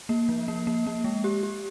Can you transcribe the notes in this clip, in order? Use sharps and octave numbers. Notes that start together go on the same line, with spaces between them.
A#3
F3
A#3
A#3
A#3
G#3
G4
G4